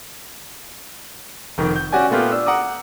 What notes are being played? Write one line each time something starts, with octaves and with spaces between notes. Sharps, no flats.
F1 D#3
G6
C#4 F#4 G4 D5 G#5
A#2 A3 B3 F4 G4
D4 E6
F#5 A#5 D6 D#6